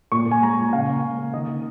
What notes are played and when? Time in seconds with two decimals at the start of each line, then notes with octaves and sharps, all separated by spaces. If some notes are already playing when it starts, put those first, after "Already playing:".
0.12 A#2 C#6
0.27 A#2 G#5
0.42 G#3 A#5
0.58 A#2
0.73 C#3 F5
0.88 A#3
1.02 C#3
1.18 A#3
1.34 D#3 D#5
1.49 D#3